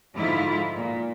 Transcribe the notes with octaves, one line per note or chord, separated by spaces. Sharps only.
G#2 D3 F3 E4 F4
A#2